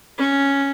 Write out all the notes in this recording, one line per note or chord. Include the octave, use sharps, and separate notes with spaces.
C#4